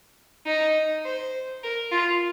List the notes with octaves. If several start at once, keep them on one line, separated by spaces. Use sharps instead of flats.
D#4
C5
A#4
F4